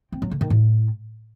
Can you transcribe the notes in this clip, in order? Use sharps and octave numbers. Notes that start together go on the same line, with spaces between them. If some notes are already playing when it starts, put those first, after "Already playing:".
C4
F#3
D3
D#3
A2